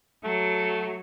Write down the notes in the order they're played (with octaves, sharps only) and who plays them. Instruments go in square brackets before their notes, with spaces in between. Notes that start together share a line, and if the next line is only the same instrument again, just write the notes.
[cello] F#3 [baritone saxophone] A3